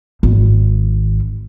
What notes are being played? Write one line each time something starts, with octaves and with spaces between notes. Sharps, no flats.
G#1